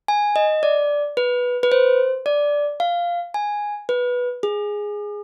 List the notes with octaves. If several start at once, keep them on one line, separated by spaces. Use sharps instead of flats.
G#5
D#5
D5
B4
B4
C5
D5
F5
G#5
B4
G#4